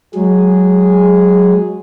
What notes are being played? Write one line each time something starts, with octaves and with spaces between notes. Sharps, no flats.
F#3 G#3 G#4